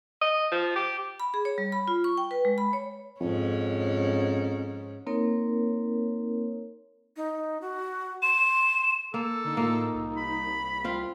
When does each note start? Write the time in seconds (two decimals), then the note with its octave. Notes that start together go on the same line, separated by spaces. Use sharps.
0.21 D#5
0.52 F3
0.76 G4
1.20 B5
1.34 G#4
1.45 C#5
1.58 G3
1.72 B5
1.88 F4
2.04 C#6
2.18 G5
2.31 B4
2.45 G#3
2.58 B5
2.73 C#5
3.20 F2 G#2 C#4
5.07 A#3 C4 D#4 A#4 C#5
7.17 D#4
7.61 F#4
8.22 C6 E7
9.14 A#3 A4
9.44 D3 D#4
9.57 A2 A#3 F4
9.94 C2
10.17 B5
10.84 C4 F4